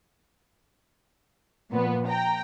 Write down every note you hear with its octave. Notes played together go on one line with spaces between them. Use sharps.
A#2 F3 B3
G5 A#5